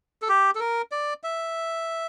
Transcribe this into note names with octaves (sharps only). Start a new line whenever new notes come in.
A4
G4
A4
A#4
D5
E5